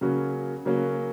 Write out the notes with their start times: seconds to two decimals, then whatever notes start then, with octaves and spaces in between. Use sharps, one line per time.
0.01 C#3 F#3 A#3 C#4 F#4
0.65 C#3 F#3 A#3 C#4 F#4